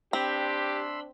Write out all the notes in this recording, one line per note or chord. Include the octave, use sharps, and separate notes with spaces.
C4 D4 G4 B5 C6 E6